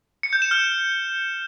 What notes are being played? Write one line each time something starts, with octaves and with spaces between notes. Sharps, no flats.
C#7
G6
E7
F6